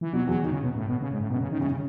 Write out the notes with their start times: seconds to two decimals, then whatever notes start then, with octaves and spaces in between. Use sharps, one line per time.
0.01 E3
0.13 B2 F#3
0.27 E2 F#3
0.43 D#3
0.52 C#3
0.62 B2
0.76 A2
0.87 B2
1.01 C#3
1.11 G#2
1.21 A2
1.30 F#2 B2
1.41 C#3
1.51 D#3
1.60 F#2 C#3
1.71 C#3